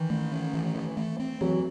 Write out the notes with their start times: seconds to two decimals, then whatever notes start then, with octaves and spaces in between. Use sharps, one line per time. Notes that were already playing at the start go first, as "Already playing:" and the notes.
Already playing: D#3 E3
0.10 A3
0.32 C#4
0.54 E3
0.76 E3
0.97 A3
1.20 C4
1.41 E3 F#3